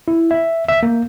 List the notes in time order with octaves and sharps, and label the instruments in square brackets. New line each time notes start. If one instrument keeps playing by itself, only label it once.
[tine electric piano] E4
E5
E5
A#3